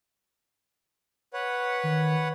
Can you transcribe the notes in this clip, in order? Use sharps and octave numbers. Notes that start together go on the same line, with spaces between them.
B4 C#5 F#5
D#3